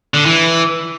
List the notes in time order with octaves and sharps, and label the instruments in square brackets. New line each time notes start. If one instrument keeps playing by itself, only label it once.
[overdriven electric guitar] D3
E3